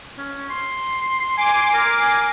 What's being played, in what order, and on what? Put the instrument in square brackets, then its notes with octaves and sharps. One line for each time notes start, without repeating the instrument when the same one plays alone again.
[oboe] C#4
C6
[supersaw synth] G#5 D6 C7
[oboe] A#4